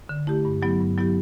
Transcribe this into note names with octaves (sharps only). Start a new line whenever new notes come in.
D3
A3 E4 G4
G2
F#3 B3 E4 G4
G2
F#3 B3 E4 G4